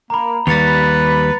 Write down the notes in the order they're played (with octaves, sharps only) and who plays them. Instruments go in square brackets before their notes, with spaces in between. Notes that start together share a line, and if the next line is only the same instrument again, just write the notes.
[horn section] A#3 [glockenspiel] A#5 B5
[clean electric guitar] D#2 G3 [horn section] B4 [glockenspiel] A6 C#7 F7